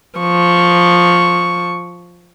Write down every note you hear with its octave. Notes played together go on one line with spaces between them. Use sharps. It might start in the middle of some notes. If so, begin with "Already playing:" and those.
F3 C#6